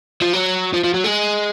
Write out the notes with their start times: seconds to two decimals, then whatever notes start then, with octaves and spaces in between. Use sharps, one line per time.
0.22 F3
0.33 F#3
0.74 F3
0.84 F3
0.94 F#3
1.04 G#3